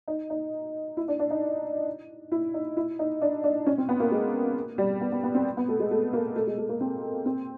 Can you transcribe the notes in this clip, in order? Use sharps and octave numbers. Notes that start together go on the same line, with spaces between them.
D#4
D#4
E4
D4
D4
D#4
E4
D#4
E4
D#4
D4
D4
C#4
C4
B3
A#3
G#3
G3
B3
B3
B3
C4
B3
A3
G#3
A3
A#3
A3
G#3
A3
A#3
C4
C4